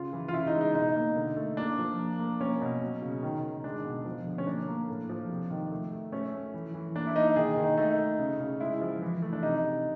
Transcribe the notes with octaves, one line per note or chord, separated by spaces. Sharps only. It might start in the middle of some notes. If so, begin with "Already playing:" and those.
Already playing: C#3 F4
E3
F4
C#3 E4
D#4
G#3
D#4
B2 D#4
A#3
D3
A3
A#3 D4
F3
A#3
A#3
A#3 C#4
B2
F#3
C#3
D#3
D#3
G#3 D4
B2
F3
D3
C#4
A#3 D4
A#3
A2
F3
C3
D#3
A3
A3
A3 C#4
A3
E3
E3
A#3 D4
E4
A#3 D#4
D#3 G#4
D#3
D#4
A3 D#4
A3
C#3
C#3
G#3 E4
F3
E3
A3
D4
C3 D#4
C3